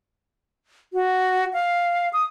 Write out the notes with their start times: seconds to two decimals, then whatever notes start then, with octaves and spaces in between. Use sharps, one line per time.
0.93 F#4
1.53 F5
2.13 D#6